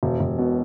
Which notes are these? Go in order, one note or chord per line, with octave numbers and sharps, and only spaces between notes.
E1
E1
B2